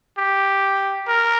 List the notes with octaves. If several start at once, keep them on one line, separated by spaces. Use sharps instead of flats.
G4
A#4